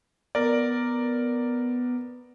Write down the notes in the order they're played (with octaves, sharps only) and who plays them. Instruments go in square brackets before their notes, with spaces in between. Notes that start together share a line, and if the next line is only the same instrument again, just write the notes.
[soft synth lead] B3 [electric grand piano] A#4 D5